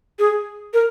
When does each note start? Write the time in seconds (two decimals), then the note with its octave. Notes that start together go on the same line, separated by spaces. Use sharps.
0.19 G#4
0.73 A#4